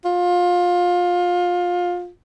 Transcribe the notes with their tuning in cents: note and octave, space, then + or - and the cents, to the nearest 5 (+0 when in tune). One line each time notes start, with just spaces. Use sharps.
F4 +20